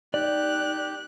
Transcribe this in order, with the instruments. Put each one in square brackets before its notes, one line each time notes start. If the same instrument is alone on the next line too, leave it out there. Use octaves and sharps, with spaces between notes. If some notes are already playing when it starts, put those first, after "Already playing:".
[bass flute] D#4 [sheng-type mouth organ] G4 [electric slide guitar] D5 [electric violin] F#6